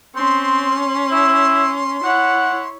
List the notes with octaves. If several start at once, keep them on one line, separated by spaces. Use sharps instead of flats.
C4 C#4 C6
E4
E4 C#5 F#5